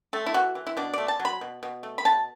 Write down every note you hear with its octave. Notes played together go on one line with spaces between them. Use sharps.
A3 A4
E4
E3 F#4
E3
E4
B2 D4
A3 D5
A5
F#3
B5
B2
B2
A3
B5
B2 A5